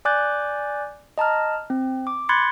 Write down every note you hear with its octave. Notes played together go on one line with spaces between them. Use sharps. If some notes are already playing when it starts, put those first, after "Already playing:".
D5 G#5 D6 F#6 G6 A6
D#5 A5 A#5 F6
C4
D6
B5 C6 F#6 G#6 A6 C#7